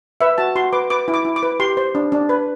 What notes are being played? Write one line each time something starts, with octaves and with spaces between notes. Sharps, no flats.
B4 E5
F#4 A5
F#4 C6
B4 D6
B4 D6
E4
D6
E4
D6
B4
G4 C6
C5
D4
D4
B4